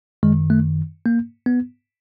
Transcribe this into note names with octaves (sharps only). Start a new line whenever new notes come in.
F#2 D#3 G#3
A3
A#3
B3